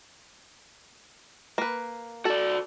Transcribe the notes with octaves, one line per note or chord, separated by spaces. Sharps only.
A#3 B4
F#4 A4 D5